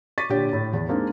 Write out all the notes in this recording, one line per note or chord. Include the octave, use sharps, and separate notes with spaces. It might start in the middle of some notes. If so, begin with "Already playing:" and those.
C#6 D6 A6 B6 D#7
A#2 D3 G4 C#5
A2
E2
G#3 A#3 C4 D4 D#4